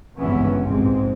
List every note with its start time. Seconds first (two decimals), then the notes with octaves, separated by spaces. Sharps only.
0.17 G#1 C#2 G2 E3 B3 C#4
0.64 F1 A#1 G#2 C3 G#3 C4